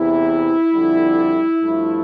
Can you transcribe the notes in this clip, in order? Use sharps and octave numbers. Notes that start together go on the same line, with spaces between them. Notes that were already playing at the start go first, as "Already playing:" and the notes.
Already playing: E2 C3 E3 E4
F2 D3 G3
G2 F3 A3